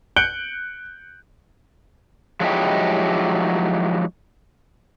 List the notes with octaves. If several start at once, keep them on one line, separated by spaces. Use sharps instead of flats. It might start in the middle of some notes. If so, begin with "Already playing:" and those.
F#6 G6 C#7 D7 F#7 G7
F3 F#3 G#3 D#4 E4 G4